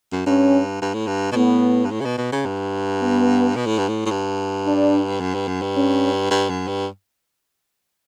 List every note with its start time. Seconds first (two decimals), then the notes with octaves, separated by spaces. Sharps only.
0.12 F#2
0.26 G2 C#4
0.81 G2
0.94 A2
1.07 G2
1.32 B2
1.36 A2 B3
1.85 G2
1.91 A2
2.00 C#3
2.05 B2
2.18 B2
2.32 C#3
2.46 G2
3.01 B3
3.56 B2
3.66 A2
3.78 G2
3.88 A2
4.05 A2
4.11 G2
4.66 D4
5.20 F#2
5.34 G2
5.48 F#2
5.62 G2
5.76 C#4
6.31 G2
6.49 F#2
6.67 G2